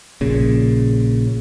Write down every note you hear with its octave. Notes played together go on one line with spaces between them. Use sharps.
A#1 A#2 C#3